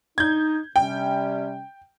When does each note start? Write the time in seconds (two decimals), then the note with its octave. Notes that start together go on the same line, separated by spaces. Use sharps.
0.18 D#4 G6 G#6
0.76 C3 G3 C#4 G5